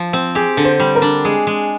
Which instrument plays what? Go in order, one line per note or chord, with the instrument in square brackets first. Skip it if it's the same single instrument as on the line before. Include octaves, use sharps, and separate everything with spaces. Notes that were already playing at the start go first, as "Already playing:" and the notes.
Already playing: [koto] F3
C4
[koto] G4 [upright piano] G#4
[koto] D3
[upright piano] C5
[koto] G3
[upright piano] A#4
[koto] D4
[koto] G#3 [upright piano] G#4
[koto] G#3